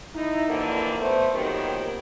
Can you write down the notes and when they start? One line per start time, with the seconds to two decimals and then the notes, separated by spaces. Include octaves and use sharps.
0.15 D#4 E4
0.48 F2 D3 E3 F#3 A#3 E4
1.00 A3 B3 C5
1.34 A#2 D#3 F#3 B3 C4 G4